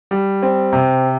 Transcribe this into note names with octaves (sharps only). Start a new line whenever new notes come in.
G3
C4
C3